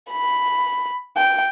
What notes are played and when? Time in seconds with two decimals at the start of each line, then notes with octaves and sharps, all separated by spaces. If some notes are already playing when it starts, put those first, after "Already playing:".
0.11 B5
1.17 G5